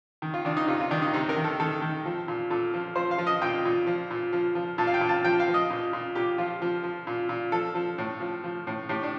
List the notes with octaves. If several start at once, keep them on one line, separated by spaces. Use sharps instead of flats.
D#3
F4
D#3 D4
D#4
C3 F4
F4
D#3 D4
D#4
C3 D#4
A#4
D#3
A4
D#3 A4
D#3
F3
A#2
A#2 A4
F3
F3 C5
F5
F3
D#5
A#2 G5
A#2
F3
A#2
F3
F3
A#2 A5
F5
G5
A#2
A5
F3 G5
F5
F3
D#5
A#2
A#2
A#2 G4
F3 F4
F3
F3
A#2
A#2
F3 A4
F3
A2
F3
F3
A2
A2 G4
D4